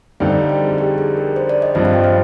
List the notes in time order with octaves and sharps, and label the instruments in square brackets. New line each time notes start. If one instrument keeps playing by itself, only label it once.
[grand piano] F2 D3 G3 C4 D#4 [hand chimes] F5
[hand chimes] D5
C5
D5
G#4
G4
G#4
A#4
C5
D5
D#5
[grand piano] G2 F3 C4 F4 [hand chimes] C5
[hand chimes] F5
G5
C5